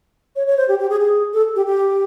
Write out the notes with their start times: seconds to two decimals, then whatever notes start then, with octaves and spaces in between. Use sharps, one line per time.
0.36 C#5
0.47 C#5
0.57 C5
0.68 G4
0.79 G4
0.90 G#4
1.00 G#4
1.34 A4
1.56 G4
1.66 G4